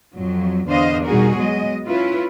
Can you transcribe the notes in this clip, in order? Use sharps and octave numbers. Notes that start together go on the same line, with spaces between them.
F2 F#3
E2 D3 D4 C5 D#5 F5
B2 G3 D#4 F#4 G#4 A#4
F#3 G#3 B3 D#5
C#4 E4 F4 B4